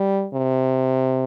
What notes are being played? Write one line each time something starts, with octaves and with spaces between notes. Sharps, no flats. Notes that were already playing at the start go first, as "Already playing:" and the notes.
Already playing: G3
C3